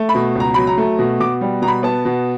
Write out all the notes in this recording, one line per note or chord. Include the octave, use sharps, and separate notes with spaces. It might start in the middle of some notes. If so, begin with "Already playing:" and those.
Already playing: A3
B5
B2
C#2 A#5
F#3 B5
A#5
A3
B2
B2 D6
G3
B2 A#5
B5
B3 A5
B2